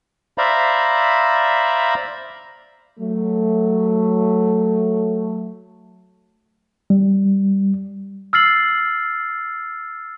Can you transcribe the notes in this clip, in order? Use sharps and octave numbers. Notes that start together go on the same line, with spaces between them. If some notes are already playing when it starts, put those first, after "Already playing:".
C5 D5 E5 F5 A#5 B5
F#3 A3
G3
E6 F6 A6 C7 F#7